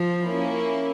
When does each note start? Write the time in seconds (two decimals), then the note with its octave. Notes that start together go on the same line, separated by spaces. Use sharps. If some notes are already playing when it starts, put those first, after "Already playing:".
Already playing: F3
0.22 A#3 C#4 E4